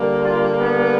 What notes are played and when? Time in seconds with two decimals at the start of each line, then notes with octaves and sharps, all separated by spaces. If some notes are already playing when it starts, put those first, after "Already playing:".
Already playing: D3 G3 A#3
0.23 F4
0.60 B3